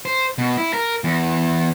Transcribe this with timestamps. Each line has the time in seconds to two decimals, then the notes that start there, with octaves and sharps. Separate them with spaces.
0.05 C5
0.38 B2
0.57 E4
0.73 A#4
1.04 E2